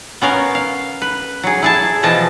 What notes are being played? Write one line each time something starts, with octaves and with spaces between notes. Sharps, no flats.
B3 C#4 A#4 F5
F5
B4
F#3 G#4
E4 G#4 A5
B2 E3 F3 D#5 A5